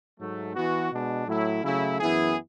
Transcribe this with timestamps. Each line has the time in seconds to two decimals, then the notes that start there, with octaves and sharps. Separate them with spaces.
0.18 G#2 F#3 A3
0.55 E3 B3 F#4
0.92 B2 G#3 D4
1.27 A2 F#3 A3 E4
1.63 C#3 F#3 A3 E4
1.99 F#2 E3 B3 E4 G#4